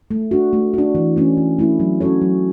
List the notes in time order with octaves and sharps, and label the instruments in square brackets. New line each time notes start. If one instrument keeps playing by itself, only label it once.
[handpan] A3
D4 F#4
A3
D4 F#4
E3
A3 C#4 E4
E3
A3 C#4 E4
F#3
C#4 F#4 A4 C#5
F#3